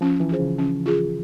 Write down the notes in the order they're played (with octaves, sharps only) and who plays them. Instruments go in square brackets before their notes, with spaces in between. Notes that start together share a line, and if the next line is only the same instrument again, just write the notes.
[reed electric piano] F3 [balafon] C#4
[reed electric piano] E3
[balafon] F4 G#4 C5
[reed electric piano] C#3
[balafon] C#4
F4 G#4